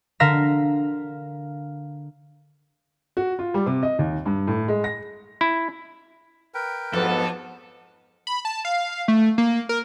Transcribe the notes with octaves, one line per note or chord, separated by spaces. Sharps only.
D3 A#4 F5 A#6 B6 E7
F#4
F4
G3
C3
D#5
D#2
G2
A2
G#3
A#6
E4
A#4 B4 G5
F2 G#2 F#3 B3 A4
B5
A5
F5
A3
A#3
A#4